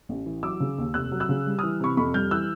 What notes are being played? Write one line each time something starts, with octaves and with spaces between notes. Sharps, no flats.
A1
E3
F#3 D6 E6
C#3
D#2
F1 E6 F#6
F#3
E6 F#6
C#3
G3
D#6 F6
E3
C3 B5 C#6
F2 B5 C#6
G3 F6 G6
E3 E6 F#6